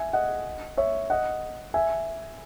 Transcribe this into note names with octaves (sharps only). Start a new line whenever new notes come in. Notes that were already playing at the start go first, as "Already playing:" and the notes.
Already playing: E5 G#5
D#5 F#5
C#5 E5
D#5 F#5
E5 G#5